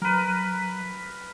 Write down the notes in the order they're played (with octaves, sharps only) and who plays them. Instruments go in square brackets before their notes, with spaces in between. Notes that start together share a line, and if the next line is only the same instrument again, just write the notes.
[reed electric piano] F#3 [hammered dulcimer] A#4 B4